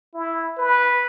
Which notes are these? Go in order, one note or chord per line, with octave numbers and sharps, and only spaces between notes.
E4
B4